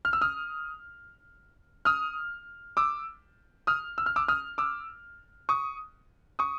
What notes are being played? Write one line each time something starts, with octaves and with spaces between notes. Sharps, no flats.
F6
E6
D#6 F6
D#6 F6
D6 E6
D#6 F6
E6
F6
D6 E6
D#6 F6
D6 E6
C#6 D#6
C#6 D#6